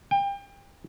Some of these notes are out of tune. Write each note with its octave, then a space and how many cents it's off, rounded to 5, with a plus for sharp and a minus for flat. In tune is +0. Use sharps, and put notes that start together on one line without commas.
G5 +30